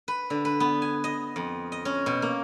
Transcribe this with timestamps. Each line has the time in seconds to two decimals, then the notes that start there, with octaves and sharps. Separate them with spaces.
0.08 B4
0.30 D3
0.45 B4
0.60 B3
0.82 G#5
1.04 D#5
1.36 F2
1.72 D#5
1.85 C#4
2.06 B2
2.22 A#3